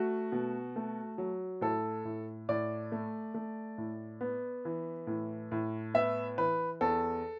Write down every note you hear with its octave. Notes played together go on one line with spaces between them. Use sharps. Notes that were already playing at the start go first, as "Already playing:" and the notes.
Already playing: A3 F#4
B2
A3
F#3
A2 A4
A2
A2 D5
A3
A3
A2
B3
E3
A2
A2
B3 E5
E3 B4
E2 A4